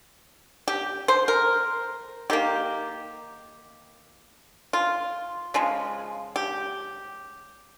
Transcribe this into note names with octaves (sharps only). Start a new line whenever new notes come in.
G4
C5
A#4
D#3 A#3 G4
F4
C#3 F3 G#3
G4